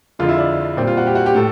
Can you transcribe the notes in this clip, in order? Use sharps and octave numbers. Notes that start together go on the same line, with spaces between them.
F2 D3 F3 G#3 F4
E4
D4
A#2 G3 C4
F4
F#4
G4
F#4
G4
A2 A4